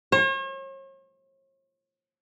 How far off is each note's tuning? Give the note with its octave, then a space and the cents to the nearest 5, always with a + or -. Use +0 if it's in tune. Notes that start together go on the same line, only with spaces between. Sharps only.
C#5 -45